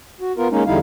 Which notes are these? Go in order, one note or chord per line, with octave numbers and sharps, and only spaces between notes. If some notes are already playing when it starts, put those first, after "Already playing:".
F#4
B3 F4 A#4
G#3 A#3 C#4 D#4
E2 D3 G3 D#4 E4 F5